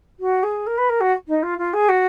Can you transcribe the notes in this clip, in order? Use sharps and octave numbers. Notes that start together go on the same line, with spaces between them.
F#4
G#4
A#4
B4
A#4
F#4
D#4
F4
F4
G#4
F#4